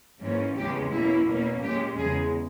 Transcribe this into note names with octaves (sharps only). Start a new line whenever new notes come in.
G#2 E3 A#3 C#4
E2 C#3 G#3 C#4 G4
B2 A#3 C#4 E4
B2 A#3 C#4
A#2 G#3 C#4 G4
E2 C#3 G#3 G#4